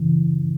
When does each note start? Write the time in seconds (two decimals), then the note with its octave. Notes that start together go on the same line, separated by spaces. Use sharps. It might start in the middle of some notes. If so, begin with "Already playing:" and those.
Already playing: F#2 C#3 E3